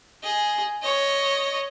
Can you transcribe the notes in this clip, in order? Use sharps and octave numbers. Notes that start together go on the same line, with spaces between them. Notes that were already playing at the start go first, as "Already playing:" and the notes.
G#4 D#5
C#5 D#5